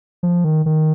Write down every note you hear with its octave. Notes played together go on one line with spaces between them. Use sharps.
F3
D#3
D#3